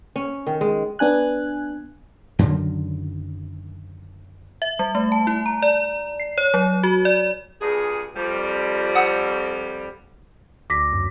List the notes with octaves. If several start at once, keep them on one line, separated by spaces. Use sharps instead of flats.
C#4
D#3
G#3
B3 D4 G#5 F#6
F#2 D3 D#3 F#3
E5
G3
A3
A5
E4
A#5
D5
C7
C#5
F#3
F#4
D5
G2 A#2 G#4
F2 G3
F#5 D#6 E6
D2 D6 A#6 B6
F#2